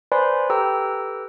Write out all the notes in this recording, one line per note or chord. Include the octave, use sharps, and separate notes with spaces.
B4 C5 D5 G#5 B5 C6
G4 A4 B4 G5 A#5 E6